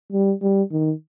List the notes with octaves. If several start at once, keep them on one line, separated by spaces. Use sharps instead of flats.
G3
G3
D#3